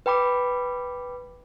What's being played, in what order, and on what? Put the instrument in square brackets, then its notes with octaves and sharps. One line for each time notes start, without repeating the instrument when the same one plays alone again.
[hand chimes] B4 G5 B5 D6